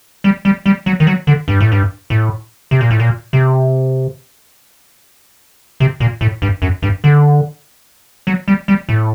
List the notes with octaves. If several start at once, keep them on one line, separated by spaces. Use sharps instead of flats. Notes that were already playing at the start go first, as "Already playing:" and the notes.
G3
G3
G3
F#3
D#3
F#3
D3
G2
A2
G2
A2
C3
A#2
A2
A#2
C3
C3
A#2
A2
G2
F#2
G2
D3
F#3
G3
G3
A2